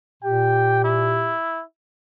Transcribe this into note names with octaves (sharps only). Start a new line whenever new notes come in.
A#2 G4 G5
E4